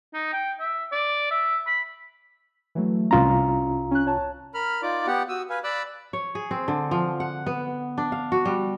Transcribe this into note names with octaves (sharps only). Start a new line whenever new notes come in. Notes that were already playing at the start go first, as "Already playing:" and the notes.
D#4
G5
E5
D5
E5
B5
E3 F#3 A3
C2 C#4 F4 A#5
C#4 F#6
C#5 A5
A#4 B5 F6
D#4 F4 D5 D6
B3 G4 F#5
F#4 D#6 E6
B4 F5 G#5
D5 B5 D6 E6 F#6
C#5
G#4
C4
D3
F3
F#5
B3
D4
F5
F#4
G3